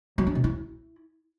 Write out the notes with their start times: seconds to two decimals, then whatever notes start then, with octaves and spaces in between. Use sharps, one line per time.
0.18 F#3
0.27 D4
0.35 B2
0.44 E4